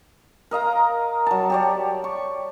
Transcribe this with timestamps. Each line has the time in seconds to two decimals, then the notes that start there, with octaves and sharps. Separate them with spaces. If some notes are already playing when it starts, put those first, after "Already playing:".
0.51 A#4 D#5 F5 A#5
1.27 F#3 A5
1.50 G4 C#5 D5
2.04 C#6